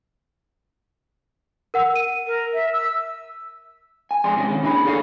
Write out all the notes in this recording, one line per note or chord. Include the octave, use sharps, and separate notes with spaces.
A#4 F#5 E6
D#7
A#4
E5
E6
G#5
F2 G#3 D5 C6
C3 G#3 C#4 D#4
D#3 C#4
C#3 A#3 D4 E4 G#4 B5
E2 G#4 A4 C#5 D5 F5